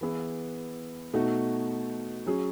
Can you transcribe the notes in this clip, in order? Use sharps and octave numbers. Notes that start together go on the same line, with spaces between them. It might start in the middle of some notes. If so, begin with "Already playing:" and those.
E3 B3 E4 G#4
B2 A3 D#4 F#4
F#3 C#4 G#4